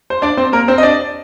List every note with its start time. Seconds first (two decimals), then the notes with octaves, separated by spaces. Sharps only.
0.10 C5
0.22 D4 D5
0.37 C4 C5
0.53 A#3 A#4
0.68 C4 C5
0.78 D#5
0.83 D4 D5